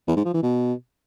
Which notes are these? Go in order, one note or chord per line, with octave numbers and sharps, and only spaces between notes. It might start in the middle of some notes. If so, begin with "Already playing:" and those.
E2
G#2
F3
E3
B2